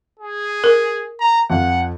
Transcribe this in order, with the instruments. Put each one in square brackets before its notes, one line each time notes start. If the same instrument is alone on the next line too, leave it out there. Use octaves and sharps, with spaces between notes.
[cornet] G#4
[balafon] A#4
[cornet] A#5
[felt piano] F2 F5 [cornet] F#5